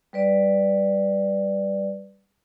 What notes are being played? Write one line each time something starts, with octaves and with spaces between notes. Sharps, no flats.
G3 B4 D5